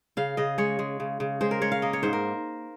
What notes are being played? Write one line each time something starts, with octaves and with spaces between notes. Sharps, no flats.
C#3 F5
C#3 D#5
G#3 C#5
G#3
C#3
C#3
G#3 C5
A#4
G#3 C#5
F5
A#3 D#5
C#5
G#2 C5
A#4